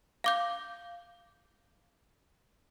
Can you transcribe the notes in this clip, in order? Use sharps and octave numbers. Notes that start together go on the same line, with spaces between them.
F5 D6 G6